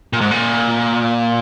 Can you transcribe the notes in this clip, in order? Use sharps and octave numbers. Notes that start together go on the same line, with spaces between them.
A#2
G#2
A#2